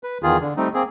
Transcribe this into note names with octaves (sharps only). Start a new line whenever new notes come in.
B4
E2 D#3 F4 G#4
D3
G3 A3 C4 D#4
A#3 C4 G#4